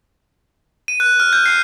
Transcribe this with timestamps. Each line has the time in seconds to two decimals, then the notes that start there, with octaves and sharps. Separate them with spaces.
0.88 D#7
1.00 F#6
1.20 F6
1.33 G6
1.46 C7